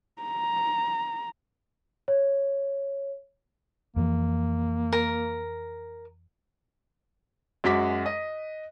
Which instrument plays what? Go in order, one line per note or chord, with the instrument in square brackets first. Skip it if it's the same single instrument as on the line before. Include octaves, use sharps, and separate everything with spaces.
[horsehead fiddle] A#5
[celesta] C#5
[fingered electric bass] F2 E3 [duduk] A#3
[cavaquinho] A#4
[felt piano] F#2 G#3 F#4 D6 B6
D#5